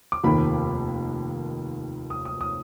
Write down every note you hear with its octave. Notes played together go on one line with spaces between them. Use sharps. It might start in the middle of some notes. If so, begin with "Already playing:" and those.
D6
F1 D#2 D#3 A#3 B5
D#6
D#6
D#6